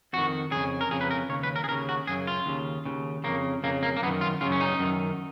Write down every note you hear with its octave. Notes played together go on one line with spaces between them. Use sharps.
F2 D#3 F#4
F2 C#3 G#4
A#4
F2 C#3 G#4
B4
A#4
D#2 C#3 C#5
B4
A#4
G#4
D#2 C#3 A#4
F#4
F#2 C#3 G#4
F4
D#2 C#3
D#2 C#3
F2 C#3 A#3
F2 C#3 A#3
A#3
A#3
F#2 D#3 B3
F4
F#2 C#3 F4
C#4
D#4
F#2 D#3